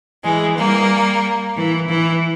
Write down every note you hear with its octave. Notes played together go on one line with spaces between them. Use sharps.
E3 G#3
G3 A#3
E3
E3